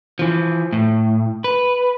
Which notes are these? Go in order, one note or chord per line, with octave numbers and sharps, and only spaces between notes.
E3 F3
A2
B4